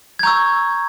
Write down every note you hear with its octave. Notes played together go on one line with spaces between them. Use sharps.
G#6
A#5 C#6 E6 G6